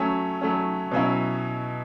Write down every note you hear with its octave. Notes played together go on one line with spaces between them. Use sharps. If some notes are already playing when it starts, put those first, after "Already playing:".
Already playing: F#3 A3 C#4
F#3 A3 C#4
B2 F#3 C#4 E4